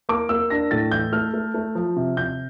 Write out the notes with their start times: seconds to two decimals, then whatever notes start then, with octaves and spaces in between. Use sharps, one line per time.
0.09 A#3 D6
0.29 A#3 E6
0.50 D4 A#6
0.71 A2 A6
0.92 E3 G6
1.13 A3 F6
1.34 A3
1.54 A3
1.75 F3
1.96 C3
2.17 C3 G6